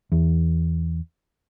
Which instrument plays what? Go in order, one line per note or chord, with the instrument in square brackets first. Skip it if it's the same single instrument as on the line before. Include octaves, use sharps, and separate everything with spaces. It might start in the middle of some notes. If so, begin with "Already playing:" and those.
[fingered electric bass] E2